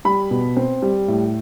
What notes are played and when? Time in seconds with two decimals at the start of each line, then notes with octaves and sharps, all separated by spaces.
0.05 G3 B5
0.31 B2
0.57 C4
0.82 G3
1.08 A2